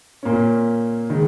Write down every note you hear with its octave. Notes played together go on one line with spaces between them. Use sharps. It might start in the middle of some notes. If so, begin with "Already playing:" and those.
A#2 A#3 C#4
D#3 G#3